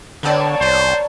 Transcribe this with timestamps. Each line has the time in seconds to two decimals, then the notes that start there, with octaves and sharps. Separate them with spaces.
0.23 D3 A#3 B3 C#5 D5 A5
0.61 C2 C5